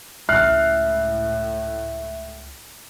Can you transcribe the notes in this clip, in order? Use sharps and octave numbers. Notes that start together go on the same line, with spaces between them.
C#2 A2 G#3 E5 F6 F#6 C7